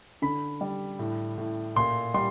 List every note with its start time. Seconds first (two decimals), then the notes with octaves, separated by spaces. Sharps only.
0.22 D3 B5
0.61 G3
0.99 A2
1.38 A2
1.76 A#2 C6
2.14 G3 C6